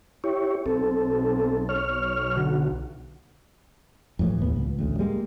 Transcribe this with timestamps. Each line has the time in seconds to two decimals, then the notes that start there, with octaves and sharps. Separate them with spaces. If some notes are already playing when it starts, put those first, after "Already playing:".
0.24 E4 G4 C#5
0.66 B1 C4 A4
1.69 C#5 F6
2.37 D3 F#4
4.19 F2 A2 E3
4.41 D#2 A2 B3
4.56 C#2
4.78 A1 D2
4.99 G3 G#3 A#3